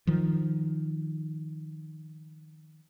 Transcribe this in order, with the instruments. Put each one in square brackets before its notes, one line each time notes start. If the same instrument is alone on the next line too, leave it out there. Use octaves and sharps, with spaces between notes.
[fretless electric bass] D#3 F3